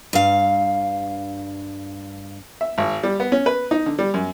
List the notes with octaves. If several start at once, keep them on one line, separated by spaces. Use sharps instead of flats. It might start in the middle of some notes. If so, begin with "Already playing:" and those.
G2 F5
E5
G#1
G3
B3
C#4
B4
D#4
D3
G3
F#2